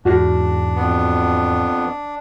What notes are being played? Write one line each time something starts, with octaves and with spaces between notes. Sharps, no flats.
E2 G#2 D4 F#4
F2 B3